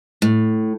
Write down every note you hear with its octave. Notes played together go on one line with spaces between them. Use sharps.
A2